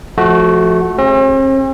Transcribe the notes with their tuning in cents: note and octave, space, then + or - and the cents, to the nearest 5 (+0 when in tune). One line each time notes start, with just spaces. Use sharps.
F3 +0 A3 -20 F#4 +0
C4 +45 G#4 -30